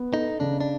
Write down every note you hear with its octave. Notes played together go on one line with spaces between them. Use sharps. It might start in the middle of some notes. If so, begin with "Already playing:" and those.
Already playing: B3
D#4 A4
C#3 D4
D4